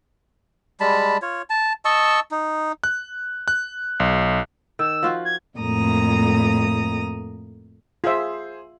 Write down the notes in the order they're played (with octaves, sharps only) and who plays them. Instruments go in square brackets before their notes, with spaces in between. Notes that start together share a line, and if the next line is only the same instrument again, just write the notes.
[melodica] G3 G#3 A5 B5
F4 C#5
A5
D#5 A5 C#6 E6
D#4
[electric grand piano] F#6
F#6
B1
[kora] D#3 [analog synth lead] E6
[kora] F3 F4 F#4
[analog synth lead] G#6
[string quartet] F2 A2 A#3 A#5 D#6
[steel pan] F4 E5 [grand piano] G#4 C5